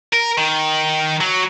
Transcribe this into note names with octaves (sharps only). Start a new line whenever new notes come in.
A#4
D#3
F#3